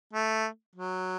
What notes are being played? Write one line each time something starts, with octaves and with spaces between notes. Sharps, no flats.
A3
F#3